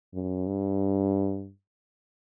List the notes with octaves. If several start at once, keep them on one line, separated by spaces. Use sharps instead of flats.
F#2
G2